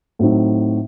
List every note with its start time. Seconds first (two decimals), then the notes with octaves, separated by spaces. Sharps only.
0.19 A2 F#3 C4 D#4 F#4